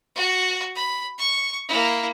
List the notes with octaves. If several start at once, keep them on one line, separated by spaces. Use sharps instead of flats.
F#4
B5
C#6
A#3 E4